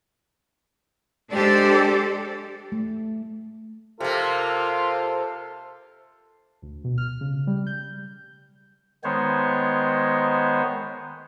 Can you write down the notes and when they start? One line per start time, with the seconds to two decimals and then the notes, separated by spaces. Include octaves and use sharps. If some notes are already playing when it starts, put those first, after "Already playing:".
1.30 G#3 D4 G4 A4 C5 D5
2.72 A3
4.00 C3 A#3 F4 A4
6.62 D2
6.84 B2
6.98 F6
7.21 C#3
7.47 G3
7.67 G6
9.04 D#3 G#3 B3 C5 C#5